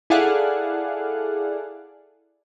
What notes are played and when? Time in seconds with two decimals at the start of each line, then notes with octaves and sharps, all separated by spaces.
0.10 E4 G#4 A4 D5 F5 F#5